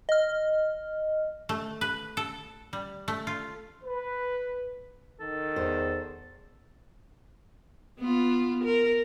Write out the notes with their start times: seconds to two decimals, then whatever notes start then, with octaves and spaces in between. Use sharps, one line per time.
0.09 D#5 F6
1.49 A3
1.81 B4
2.17 A4
2.73 G3
3.08 A3
3.27 F4
3.83 B4
5.20 D#3 A4
5.56 E2 C5
8.00 B3 F4
8.64 A#4